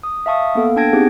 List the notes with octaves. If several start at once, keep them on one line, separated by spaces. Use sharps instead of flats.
D#6
E5 F5 A5 C#6 D#6
A#3 B3 A4 F5
D4 G5 A5 G#6 A#6 D7
B3 C4 D#4 G4 G#4